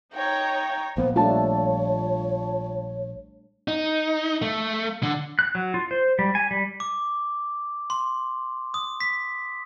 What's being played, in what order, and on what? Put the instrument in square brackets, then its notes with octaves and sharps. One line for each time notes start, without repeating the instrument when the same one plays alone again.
[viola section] D#4 C#5 A#5 [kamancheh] G5
[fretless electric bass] A#1 A#3 B3 [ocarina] C5
[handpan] G3 A3 D4 [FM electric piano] F4 A5 [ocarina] C#5
[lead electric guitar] D#4
A3
D3
[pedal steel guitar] F#6
F#3
F4
C5
G3
G#5
G3
[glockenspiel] D6
C6
D#6
B6